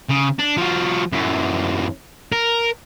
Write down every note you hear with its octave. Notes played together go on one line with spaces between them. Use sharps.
C#3
D4
F3 F#4
F#2 E3
A#4